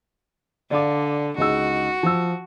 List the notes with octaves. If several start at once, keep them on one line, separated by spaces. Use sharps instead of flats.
D3 D5 F5 D6
C#2 D#4 F#4 E6
F3 E6